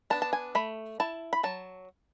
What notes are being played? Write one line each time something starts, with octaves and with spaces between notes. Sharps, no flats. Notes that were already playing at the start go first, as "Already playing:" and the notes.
B3 D4 A5
A5
G#5
A3 B5
E4 A5
B5
F#3 A5